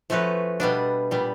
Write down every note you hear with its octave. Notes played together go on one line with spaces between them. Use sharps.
F3 A3 C#4 F#4 B4
B2 G3 B3 D4
A#2 G3 B3